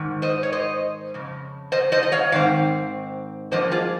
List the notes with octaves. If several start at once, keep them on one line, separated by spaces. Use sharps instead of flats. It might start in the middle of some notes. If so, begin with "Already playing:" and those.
Already playing: G#2 D#3
C5 D#5
C#5
C5 D#5
F2 C#3
C5 D#5
C5 D#5
D#5
C#5 F5
G#2 D#3 C4 F5
G2 F3 A#3 C#4 C5 D#5
F4 G#4